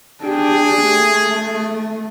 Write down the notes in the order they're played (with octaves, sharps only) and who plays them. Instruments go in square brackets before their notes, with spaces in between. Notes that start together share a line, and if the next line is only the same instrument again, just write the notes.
[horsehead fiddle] D4 G4 [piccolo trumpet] G#4
[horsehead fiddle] A3